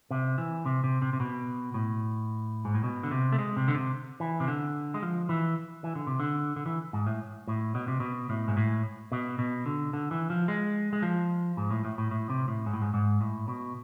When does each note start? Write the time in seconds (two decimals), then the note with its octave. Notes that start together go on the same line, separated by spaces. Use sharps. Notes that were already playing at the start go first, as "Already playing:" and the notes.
0.11 C3
0.38 E3
0.65 C3
0.84 C3
1.02 C3
1.13 C3
1.20 B2
1.74 A2
2.65 G#2
2.75 A2
2.84 B2
3.03 D3
3.11 C3
3.32 A3
3.39 G#3
3.57 C3
3.68 D3
3.75 C3
4.20 E3
4.40 C3
4.48 D3
4.94 G#3
5.02 F3
5.29 E3
5.84 E3
5.95 D3
6.07 C3
6.20 D3
6.56 D3
6.66 E3
6.93 G#2
7.07 A2
7.48 A2
7.75 B2
7.88 C3
8.00 B2
8.30 A2
8.48 G#2
8.57 A2
9.12 B2
9.39 B2
9.66 D3
9.93 D3
10.11 E3
10.30 F3
10.48 G#3
10.93 G#3
11.02 F3
11.57 G#2
11.71 A2
11.85 A2
11.98 A2
12.11 A2
12.30 C3
12.48 A2
12.66 G#2
12.73 A2
12.82 G#2
12.94 G#2
13.21 A2
13.48 B2